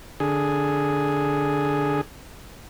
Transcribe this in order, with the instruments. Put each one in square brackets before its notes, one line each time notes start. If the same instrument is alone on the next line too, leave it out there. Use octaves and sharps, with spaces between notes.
[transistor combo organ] D3 G#4